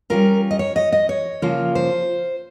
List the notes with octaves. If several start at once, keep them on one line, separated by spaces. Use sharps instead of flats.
G3 C#4 F4 A#4
D#5
C#5
D#5
D#5
C#5
C#3 F3 A#3 F4
C5